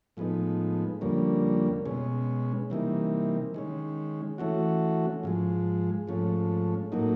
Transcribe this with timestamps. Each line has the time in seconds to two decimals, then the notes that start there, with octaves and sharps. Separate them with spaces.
0.17 A2 F3 G#3 B3 D#4
1.01 F2 D3 G3 A#3 C#4
1.85 B2 G#3 C#4
2.70 C3 E3 G3 A#3 D#4
3.54 D#3 G#3 C#4
4.38 E3 A3 C#4 F#4
5.23 G#2 F3 G#3
6.07 G#2 F3 A3 C#4
6.92 A2 F#3 A#3 D#4